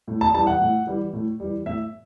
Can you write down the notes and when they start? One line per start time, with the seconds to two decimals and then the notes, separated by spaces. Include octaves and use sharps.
0.08 A2
0.21 A5
0.35 E3 G3 A5
0.47 F#5
0.61 A2
0.87 E3 G3
1.13 A2
1.40 E3 G3
1.66 A2 E5